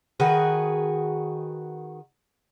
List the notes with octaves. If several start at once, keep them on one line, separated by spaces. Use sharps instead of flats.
D#3 F#4 G#4 B4